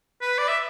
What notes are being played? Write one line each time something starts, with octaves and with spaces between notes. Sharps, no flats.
B4
D5
E5